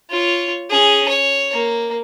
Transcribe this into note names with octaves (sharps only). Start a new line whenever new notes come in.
F4 C#5
C#4 G#4
C#5
A#3